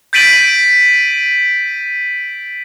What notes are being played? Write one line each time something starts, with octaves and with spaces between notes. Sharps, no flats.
G6 A6 B6 D7 D#7 F#7